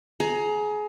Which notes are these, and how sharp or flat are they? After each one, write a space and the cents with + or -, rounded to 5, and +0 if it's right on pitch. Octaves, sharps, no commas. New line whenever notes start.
G#4 +25 A#5 +0